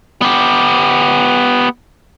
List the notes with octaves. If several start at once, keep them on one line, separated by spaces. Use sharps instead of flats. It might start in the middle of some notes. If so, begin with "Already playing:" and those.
B3 G4